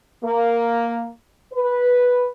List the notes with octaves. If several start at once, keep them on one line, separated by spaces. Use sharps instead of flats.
A#3
B4